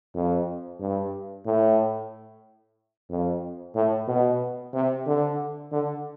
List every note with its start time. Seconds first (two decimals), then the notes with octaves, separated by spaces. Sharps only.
0.14 F2
0.80 G2
1.46 A2
3.09 F2
3.75 A2
4.08 B2
4.73 C3
5.06 D3
5.72 D3